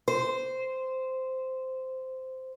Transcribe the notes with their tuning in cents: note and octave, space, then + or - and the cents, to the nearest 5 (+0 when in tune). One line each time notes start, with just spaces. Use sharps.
C5 -10